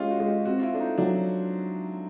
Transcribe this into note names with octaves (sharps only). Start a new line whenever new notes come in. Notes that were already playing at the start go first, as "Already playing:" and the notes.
Already playing: G#3 C#4 F4 G4 G#4
F#4
G#3
G4
C4 F#4
F4
E4
A3 D4
D#4
F#3 D4